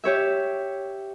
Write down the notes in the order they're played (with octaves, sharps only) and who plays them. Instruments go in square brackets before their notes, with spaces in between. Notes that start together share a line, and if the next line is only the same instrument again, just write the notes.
[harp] G4 C#5 E5